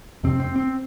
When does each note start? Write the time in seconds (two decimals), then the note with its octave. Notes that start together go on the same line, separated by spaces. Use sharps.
0.23 F2 C3 C4
0.40 C4
0.56 C4